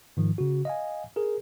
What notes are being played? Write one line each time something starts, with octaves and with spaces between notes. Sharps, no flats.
G#2 D#3 F3
C#3 F#4
D#5 F5 G#5
G#4 A#4